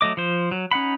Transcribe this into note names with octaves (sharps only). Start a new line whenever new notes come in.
F#3 A3 D#5 D6
F3 C5
F#3
C#4 D#4 F#5 B5